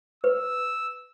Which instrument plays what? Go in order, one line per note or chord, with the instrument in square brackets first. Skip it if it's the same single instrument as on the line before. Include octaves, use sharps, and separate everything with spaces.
[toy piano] B4 [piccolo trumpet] E6